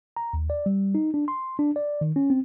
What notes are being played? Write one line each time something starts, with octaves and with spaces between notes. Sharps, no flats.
A#5
D#2
D5
G3
D#4
D4
C6
D4
D5
D#3
C#4
C4